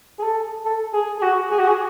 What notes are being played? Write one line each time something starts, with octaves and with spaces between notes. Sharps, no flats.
G#4
A4
A4
G#4
G#4
F#4
G#4
F#4
G#4